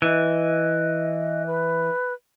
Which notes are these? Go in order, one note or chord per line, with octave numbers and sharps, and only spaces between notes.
E3 D#5
B4